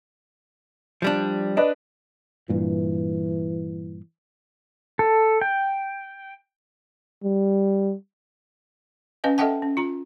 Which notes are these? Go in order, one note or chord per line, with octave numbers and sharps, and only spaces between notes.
F3 G3 D4
D4 B4 D5 D#5
G2 A#2 E3
A4
G5
G3
C#4 B4 D#5 F5 G#5
A4 D#5 E5 F#5 G5 A5
C#4
F4 A#5